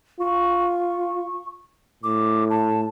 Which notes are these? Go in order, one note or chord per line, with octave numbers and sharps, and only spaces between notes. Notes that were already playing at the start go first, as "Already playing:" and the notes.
F4 C#6
A2 D6
A5